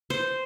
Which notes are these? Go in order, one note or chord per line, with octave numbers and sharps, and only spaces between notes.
C5